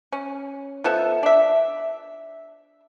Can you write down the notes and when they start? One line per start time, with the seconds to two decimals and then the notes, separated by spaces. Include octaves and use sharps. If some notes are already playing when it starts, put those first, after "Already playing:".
0.12 C#4
0.84 F3 B3 A4 E5
1.23 D4 E5